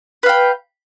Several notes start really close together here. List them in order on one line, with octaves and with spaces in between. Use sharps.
B4 F5 G5